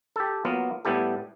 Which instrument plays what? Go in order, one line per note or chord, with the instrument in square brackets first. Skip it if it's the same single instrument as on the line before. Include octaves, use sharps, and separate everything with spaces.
[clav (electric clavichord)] G4 A4
F#3 A#3 B3 F4
A2 G3 B3 E4 G4 A4